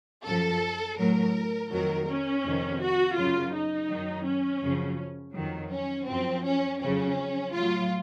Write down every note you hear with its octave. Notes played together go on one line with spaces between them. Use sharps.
F#2 F3 A4
A2 F#3 A#4
F2 D#3 F#3 A#4
C#4
F2 C3 D#3
F#4
F#2 C#3 F#3 F4
D#4
F#2 D#3 F#3
C#4
F#2 C#3 F3
F2 D#3 F#3
C#4
F#2 F3 C4
C#4
F2 C#3 F#3 C#4
A2 F#3 F4